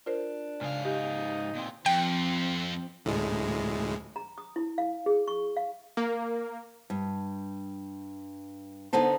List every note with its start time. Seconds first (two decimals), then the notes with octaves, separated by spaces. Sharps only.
0.06 D4 F4 A#4 C5
0.61 G#2 C#3 F5
0.85 D#4 G4
1.55 A#2 C4
1.86 F2 F3 C4 G5
3.05 D2 A2 G#3
4.16 A#5
4.38 D#6
4.56 E4
4.78 F5
5.06 G#4
5.28 C#6
5.57 F5
5.97 A#3
6.90 G2
8.93 D3 B3 D#4 C5 A5